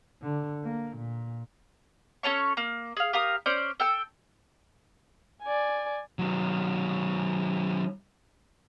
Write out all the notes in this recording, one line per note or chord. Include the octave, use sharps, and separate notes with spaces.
D3
A#3
A#2
C#4 A4 C#5 C#6
A#3
G#4 F5
G4 A#4 F5 D#6
C#4 C5 D5 G6
A4 G5 E6
D5 G#5
D#3 F#3